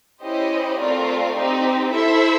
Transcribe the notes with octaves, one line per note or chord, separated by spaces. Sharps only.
C#4 E4 G4 C5 D#5
A3 C4 F4 A#4 D5
C4 D#4 G4
E4 A4 C5 E5